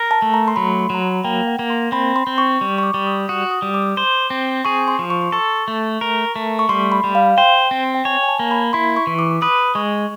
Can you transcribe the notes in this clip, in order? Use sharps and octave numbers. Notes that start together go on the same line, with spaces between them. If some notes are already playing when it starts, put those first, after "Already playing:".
Already playing: A#4
A5
A3
A#5
C6
F#3 B5
C6
F#3 A#5
B5
A#3 G5
F#5
A#3
C6
C4 B5
C6
C4
C#6
G3
C#6
D6
G3
D#6
F#4 D#6
D#6
G3
D6
C5
C4
G#4 C#6
C6
F3
C#6
C6
A4 C#6
A3
A#4
A3
C#6
G3 C6
B5
G3
F5
C5 G5
C4
G5
C#5 G#5
G#5
A5
A#3
B5
E4 C6
C#6
E3
D6
B4 D#6
G#3 C#6